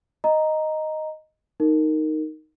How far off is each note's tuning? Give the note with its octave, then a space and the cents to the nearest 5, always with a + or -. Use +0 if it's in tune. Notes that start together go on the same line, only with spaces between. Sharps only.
D#5 +0 A#5 +0
D#4 +0 A#4 -15